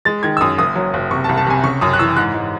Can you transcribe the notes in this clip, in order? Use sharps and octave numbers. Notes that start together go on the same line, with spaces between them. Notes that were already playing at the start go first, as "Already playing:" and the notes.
G#3 A6
D#3 G#6
E6
F#2 D#6
F#1 D#6
F#3
F#1
C3 C#6
A5
C2
A5
C3 G#5
C#3 C#6
F#2 D#6
F#6
E3 E6
G#2 F#6
G#2